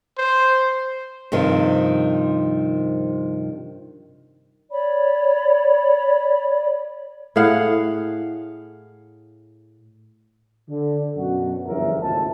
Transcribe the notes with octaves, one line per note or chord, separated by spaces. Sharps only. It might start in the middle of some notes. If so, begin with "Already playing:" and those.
C5
G2 C3 D#3 F3
C#5 D5 B5
A2 G#4 F5 F#5
D3
F#2 B2 F#4
G1 E2 F3 C#4 A#4 E5
G#1 C#2 A2 A5